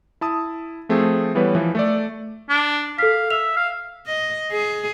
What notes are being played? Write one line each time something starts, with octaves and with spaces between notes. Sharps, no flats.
E4 A5 D#6
F3 A3 C4 G#4 A4
E3 G3 B3 B4 C#5
E3 F3
A3 A4 D5
D4
A4 F5 B6
E5 F7
F5
D#5
G#4